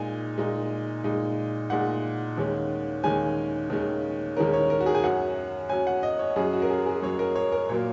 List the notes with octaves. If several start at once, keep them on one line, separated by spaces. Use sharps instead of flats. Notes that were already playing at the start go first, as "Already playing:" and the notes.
Already playing: A#2 G#3 D#4 G#5
A#2 G#3 D#4
A#2 G#3 D#4
A#2 G#3 D#4 F#5
D#2 D#3 G#3 C#4
D#2 D#3 G#3 C#4 G#5
D#2 D#3 G#3 C#4
D#2 D#3 G#3 C#4 A#4
C#5
A#4
F#4
G#4
G#5
F#2 F#3 C#4 F#5
F#2 F#3 C#4 G#5
F#5
D#5
C#5
F#2 F#3 C#4 G#4
F#4
A#4
G#4
G#4
F#2 F#3 C#4 C#5
A#4
C#5
A#4
A#2 F#3 A#3 C#5